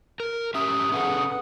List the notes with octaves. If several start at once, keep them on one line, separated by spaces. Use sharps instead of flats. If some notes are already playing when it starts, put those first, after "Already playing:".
A#4
C#4 G4 E5 D#6
C#4 G#4 A4 B4 F#5